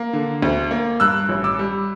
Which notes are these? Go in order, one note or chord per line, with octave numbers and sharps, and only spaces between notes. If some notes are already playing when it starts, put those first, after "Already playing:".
Already playing: A#3
D3
D2
A#3
G2 E6 F#6
A1
D6 E6
G3